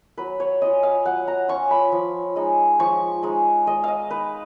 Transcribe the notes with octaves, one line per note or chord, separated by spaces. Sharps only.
F#3 B4
C#5
C#4 F4 D#5
F5
F#3 F#5
A#5
C#4 F4 C#6
B5
F3
G#3 D#4
F3 C#6
G#3 D#4
G#3 D#5
D#5 F5
D#4 B4